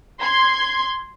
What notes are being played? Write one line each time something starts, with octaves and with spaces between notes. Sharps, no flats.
C6 G#6